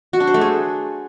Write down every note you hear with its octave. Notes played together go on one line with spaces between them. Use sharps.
F#4
D4
C5
A3
G#4